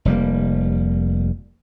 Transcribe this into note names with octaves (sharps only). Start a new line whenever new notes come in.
F1 G3 A#3